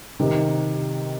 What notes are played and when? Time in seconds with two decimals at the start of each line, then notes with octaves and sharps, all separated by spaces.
0.19 C3 D#3 C4